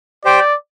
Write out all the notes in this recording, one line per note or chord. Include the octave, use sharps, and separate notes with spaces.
G4 C5 D5 G5